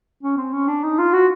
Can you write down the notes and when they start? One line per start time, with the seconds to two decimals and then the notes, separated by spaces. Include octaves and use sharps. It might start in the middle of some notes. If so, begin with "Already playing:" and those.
0.23 C#4
0.37 C4
0.53 C#4
0.68 D4
0.83 D#4
0.99 F4
1.13 F#4